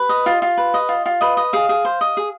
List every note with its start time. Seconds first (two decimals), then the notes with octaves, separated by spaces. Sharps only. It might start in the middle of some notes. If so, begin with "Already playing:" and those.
Already playing: B4
0.09 D#5
0.26 F4
0.42 F4
0.57 B4
0.74 D#5
0.89 F4
1.06 F4
1.21 B4 D#5
1.37 D#5
1.53 G#4 F5
1.69 G#4
1.85 C5
2.01 D#5
2.17 G#4